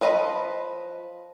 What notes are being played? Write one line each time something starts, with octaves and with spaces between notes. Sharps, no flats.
F3 B4 D#5 A#5 B5